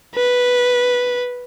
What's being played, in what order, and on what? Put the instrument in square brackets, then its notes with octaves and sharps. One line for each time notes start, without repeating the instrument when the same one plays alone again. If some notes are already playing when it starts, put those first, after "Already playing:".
[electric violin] B4